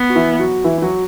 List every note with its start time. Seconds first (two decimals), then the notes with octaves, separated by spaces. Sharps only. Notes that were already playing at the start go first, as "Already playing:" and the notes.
Already playing: B3
0.10 F#4
0.15 E3 E4
0.39 F#3 F#4
0.64 E3 E4
0.78 E4
0.82 F#3 F#4